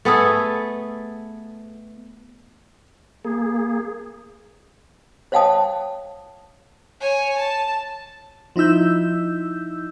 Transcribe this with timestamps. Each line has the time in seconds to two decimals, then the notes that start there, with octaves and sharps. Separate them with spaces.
0.05 A3 B3 G#4 A4
3.25 A#3 G#4
5.32 C5 C#5 F5 G5 A5 D#6
7.00 C#5 G#5
7.38 A5
8.56 F3 D#4 E4 E6 G6